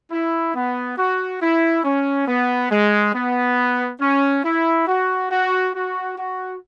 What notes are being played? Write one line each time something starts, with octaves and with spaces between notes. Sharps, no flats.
E4
B3
F#4
E4
C#4
B3
G#3
B3
C#4
E4
F#4
F#4
F#4
F#4